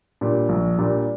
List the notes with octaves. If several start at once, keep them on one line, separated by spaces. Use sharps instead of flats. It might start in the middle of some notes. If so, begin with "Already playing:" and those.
A#2 G3 D4
A#1
A#2 G3 D4